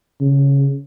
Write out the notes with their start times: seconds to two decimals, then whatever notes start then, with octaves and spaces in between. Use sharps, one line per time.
0.21 C#3